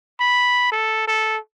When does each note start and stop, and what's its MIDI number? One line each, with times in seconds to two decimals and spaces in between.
0.20 0.67 83
0.72 1.04 69
1.07 1.38 69